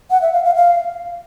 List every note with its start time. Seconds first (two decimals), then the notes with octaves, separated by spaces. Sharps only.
0.11 F#5
0.22 E5
0.33 F5
0.44 F5
0.55 F5